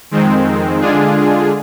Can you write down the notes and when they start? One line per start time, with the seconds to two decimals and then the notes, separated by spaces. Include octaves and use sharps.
0.11 F2 D#3 G#3 C4
0.80 D3 G#3 D4 F4 G#4